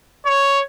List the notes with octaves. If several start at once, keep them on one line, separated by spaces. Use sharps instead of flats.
C#5